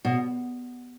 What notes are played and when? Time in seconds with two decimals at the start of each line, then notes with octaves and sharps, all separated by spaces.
0.05 B2